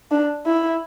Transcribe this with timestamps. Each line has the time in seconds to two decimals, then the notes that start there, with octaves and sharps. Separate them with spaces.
0.11 D4
0.46 E4